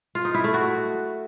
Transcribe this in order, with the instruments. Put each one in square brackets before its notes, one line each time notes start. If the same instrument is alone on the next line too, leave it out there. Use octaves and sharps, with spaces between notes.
[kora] F4
D#4
E4
A3
F#4